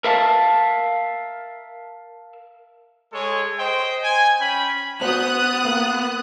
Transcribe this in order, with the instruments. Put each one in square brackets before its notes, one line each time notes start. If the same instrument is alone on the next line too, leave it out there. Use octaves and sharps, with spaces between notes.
[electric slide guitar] A#4 E5 F5 A5
[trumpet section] G#3 A4 C#5
C5 D#5 G5
G#5
C#4 G5 B5
[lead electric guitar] B3 [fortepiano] F#4 C5 [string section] D#6 F#6
[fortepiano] A#3 F5